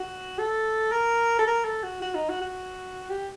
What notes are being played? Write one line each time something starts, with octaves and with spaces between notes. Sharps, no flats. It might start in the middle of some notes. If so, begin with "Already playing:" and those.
Already playing: F#4
A4
A#4
A4
A#4
A4
F#4
F#4
D#4
F#4
F#4
G4